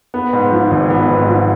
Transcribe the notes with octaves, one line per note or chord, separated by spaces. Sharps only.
B3
G#2
F3
G#1
B3
G#2
F3